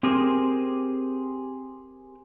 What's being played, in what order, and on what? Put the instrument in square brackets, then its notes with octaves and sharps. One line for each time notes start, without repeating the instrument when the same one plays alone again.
[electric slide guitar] C4 G4 G#4 A#4 C5